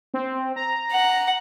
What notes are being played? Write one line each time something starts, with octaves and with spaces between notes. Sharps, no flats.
C4
A#5
F#5